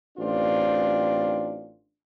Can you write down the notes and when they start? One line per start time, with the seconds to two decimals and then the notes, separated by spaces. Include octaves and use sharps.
0.18 A1 C4 D4 F4